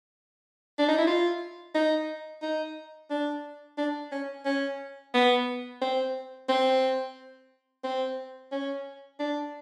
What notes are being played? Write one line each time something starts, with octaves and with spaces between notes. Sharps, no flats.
D4
D#4
E4
F4
D#4
D#4
D4
D4
C#4
C#4
B3
C4
C4
C4
C#4
D4